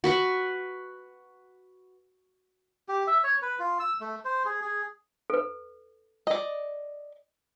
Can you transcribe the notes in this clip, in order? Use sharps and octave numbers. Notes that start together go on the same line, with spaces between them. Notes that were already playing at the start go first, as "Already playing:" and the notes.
F#4 B4 F#5
G4
E5
C#5
B4
F4
E6
A3
C5
G#4
G#4
A4 B4
D5 D#5